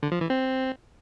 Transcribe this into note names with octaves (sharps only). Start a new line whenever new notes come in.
D3
F3
E3
C4